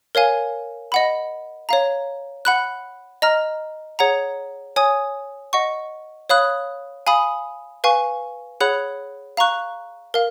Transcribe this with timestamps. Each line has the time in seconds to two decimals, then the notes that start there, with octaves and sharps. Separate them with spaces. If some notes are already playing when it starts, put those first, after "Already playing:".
0.15 A#4 C#5 F5 G#5
0.92 D#5 F#5 B5
1.69 C#5 F5 A#5
2.45 F#5 B5 F#6
3.22 D#5 A#5 F6
3.99 G#4 C#5 F#5 A#5
4.76 C#5 G#5 D#6
5.53 D#5 F#5 C#6
6.30 C#5 F5 B5 D#6 F#6
7.07 F5 G#5 B5 D#6
7.84 B4 F5 G#5 C#6
8.61 G#4 C#5 F#5 B5 F#6
9.37 F5 A#5 C#6 F#6
10.14 A#4 F5